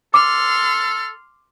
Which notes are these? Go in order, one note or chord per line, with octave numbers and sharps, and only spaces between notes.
A4 C6 D6 F6